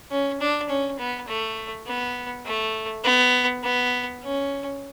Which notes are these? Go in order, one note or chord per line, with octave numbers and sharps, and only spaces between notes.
C#4
D4
C#4
B3
A3
B3
A3
B3
B3
C#4